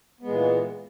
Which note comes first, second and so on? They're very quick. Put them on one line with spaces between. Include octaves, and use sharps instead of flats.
B3 G#3 A#2 E3